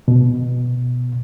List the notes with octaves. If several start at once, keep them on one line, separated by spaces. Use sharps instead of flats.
B2